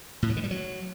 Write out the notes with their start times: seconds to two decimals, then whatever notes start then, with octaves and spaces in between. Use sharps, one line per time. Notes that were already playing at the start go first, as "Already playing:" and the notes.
0.22 A2
0.30 F#3
0.37 D#3
0.44 G3
0.51 F#3